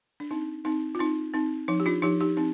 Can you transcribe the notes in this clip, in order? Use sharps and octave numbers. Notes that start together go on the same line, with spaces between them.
D4
C4 D#4
C4 D#4
F4
C4 D#4
C4 D#4
F3 D#4
G4
D4 F4
F3 D#4 G4
D#4 G4
C4 D#4